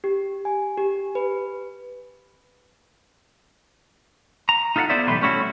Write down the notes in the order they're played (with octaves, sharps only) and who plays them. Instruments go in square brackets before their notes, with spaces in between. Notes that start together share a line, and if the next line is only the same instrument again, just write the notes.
[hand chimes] G4
G#5
G4
B4
[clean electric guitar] A#5
D#4 F4 A4 E5 F#5
B3 E4 A4 C5 D5 E5
B1 E2 A2 G3 B4 C6
G3 A3 C#4 E4 F#4